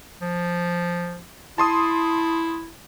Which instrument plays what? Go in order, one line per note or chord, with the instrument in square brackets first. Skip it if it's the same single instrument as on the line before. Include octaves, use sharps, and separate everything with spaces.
[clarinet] F3
[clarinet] E4 [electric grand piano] A5 C6 D#6